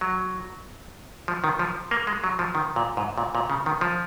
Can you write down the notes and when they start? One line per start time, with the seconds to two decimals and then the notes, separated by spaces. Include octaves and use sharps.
0.01 F#3
1.28 F3
1.44 D#3
1.59 F3
1.91 A#3
2.07 G#3
2.24 F#3
2.39 F3
2.55 D#3
2.76 A#2
2.97 G#2
3.18 A#2
3.35 A#2
3.50 C#3
3.66 D#3
3.81 F3